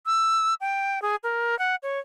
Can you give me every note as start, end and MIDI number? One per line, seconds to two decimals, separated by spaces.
0.06 0.54 88
0.61 1.02 79
1.02 1.16 68
1.23 1.58 70
1.59 1.75 78
1.83 1.99 73